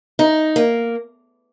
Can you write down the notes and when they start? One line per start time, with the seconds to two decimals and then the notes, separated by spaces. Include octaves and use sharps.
0.19 D#4
0.56 A#3